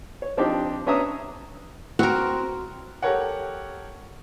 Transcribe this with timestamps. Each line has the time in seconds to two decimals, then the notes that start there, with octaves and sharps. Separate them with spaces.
0.22 C#5
0.37 F3 C4 D4 D#4 G4
0.86 B3 C#4 D4 E5 A#5 D#6
1.99 C4 F#4 A#4
3.02 G4 A4 A#4 C#5 F#5